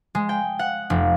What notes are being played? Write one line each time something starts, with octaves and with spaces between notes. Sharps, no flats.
G#3
G5
F#5
F1